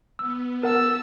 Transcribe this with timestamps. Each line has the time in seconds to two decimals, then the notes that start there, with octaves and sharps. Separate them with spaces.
0.19 B3 E6
0.63 A#4 F#5 A5 E6